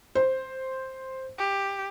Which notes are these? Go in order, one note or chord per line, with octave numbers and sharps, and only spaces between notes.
C5
G4